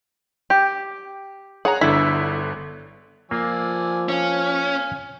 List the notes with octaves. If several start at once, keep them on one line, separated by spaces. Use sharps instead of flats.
G4
G#4 C#5 F#5 A#5
G1 D3 E4 B6
F3 A#3 F4 D5 G#5 E6
C#4 F5 G#5